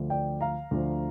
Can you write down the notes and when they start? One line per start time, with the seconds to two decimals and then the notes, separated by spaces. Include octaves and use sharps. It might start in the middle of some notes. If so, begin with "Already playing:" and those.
Already playing: D2 D3 F3
0.10 D5 G5
0.41 F5 A#5
0.71 D2 D3 F3